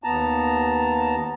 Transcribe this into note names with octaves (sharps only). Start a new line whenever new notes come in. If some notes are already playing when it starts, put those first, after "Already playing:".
D#2 B3 A5 A#5